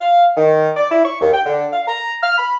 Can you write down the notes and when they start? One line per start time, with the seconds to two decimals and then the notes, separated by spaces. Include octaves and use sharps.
0.01 F5
0.37 D#3
0.76 D5
0.91 E4
1.04 C#6
1.21 D#2
1.33 G5
1.46 D3
1.72 F5
1.87 A#5
2.23 F6
2.38 B5